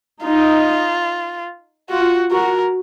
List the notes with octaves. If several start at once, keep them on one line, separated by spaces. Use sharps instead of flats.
D#4 F4
F4 F#4
F#4 A#4